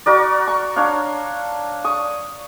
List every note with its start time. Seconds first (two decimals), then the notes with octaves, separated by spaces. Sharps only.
0.06 F#4 A#4 D5
0.47 C#6
0.76 D4 C#5 F5
1.84 C#6 D#6